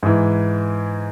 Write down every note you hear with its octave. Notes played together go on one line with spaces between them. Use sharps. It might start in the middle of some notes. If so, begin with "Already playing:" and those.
G#2 E3